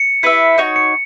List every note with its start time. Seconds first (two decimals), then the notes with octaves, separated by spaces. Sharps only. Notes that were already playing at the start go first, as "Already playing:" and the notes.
Already playing: C#7
0.23 E4 B4 E5
0.58 D#4 F#4 C#5
0.76 C#7